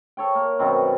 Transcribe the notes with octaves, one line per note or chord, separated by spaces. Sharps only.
A4 C#5 G5
A#3
F#2 B2 D#3 C4